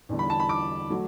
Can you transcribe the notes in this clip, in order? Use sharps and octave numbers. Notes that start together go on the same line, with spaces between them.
E2 D3 G3
B5
A5
B5
D6
F#3 A3